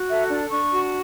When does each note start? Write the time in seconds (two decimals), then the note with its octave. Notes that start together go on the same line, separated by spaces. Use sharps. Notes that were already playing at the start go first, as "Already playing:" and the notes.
Already playing: F#4
0.09 A4 E5
0.30 D4
0.51 D4 C#6
0.71 F#4